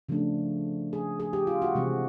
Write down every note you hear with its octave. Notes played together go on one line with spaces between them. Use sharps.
C#3 F3 A3 D4
G#4
G#4
G4
F4
F#4
C3 E3 G#3 C4